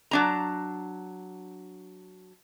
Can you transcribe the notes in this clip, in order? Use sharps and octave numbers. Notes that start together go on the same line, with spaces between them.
F#3 D4 A#5